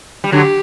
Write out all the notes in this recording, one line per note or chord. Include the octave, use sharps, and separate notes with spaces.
G3
D3 F#3 G4